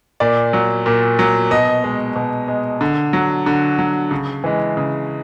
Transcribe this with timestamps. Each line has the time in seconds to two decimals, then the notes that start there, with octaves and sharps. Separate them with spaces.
0.20 A#2 D5
0.53 F#3
0.86 A#2
1.19 F#3
1.51 B2 D#5
1.84 G#3
2.16 B2
2.48 G#3
2.81 D3
3.13 F#3
3.46 D3
3.79 F#3
4.11 C#3
4.44 E3 G#3
4.77 C#3